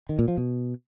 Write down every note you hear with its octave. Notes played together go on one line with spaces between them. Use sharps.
D#3
A#2
F3
B2